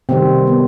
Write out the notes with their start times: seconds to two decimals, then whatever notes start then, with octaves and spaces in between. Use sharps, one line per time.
0.09 C3 D#3 G3 C4
0.47 B3